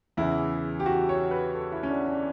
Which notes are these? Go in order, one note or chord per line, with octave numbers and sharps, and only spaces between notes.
E2 C#3 E3 E4
G4
F#4
C#5
B4
A4
E4
C#4
D4
D4